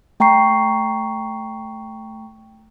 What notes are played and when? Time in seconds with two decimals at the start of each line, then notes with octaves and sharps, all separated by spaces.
0.20 A3 G5 A#5 C#6 C7